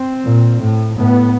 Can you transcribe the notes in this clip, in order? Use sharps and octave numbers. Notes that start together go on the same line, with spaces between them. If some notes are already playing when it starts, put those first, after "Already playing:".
Already playing: C4
A#2
A2
A2 B3